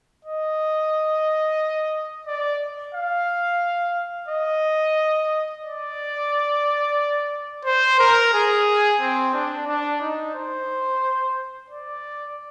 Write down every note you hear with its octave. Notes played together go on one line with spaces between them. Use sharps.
D#5
D5
F5
D#5
D5
C5
A#4
G#4
C4
D4
D4
D#4
C5
D5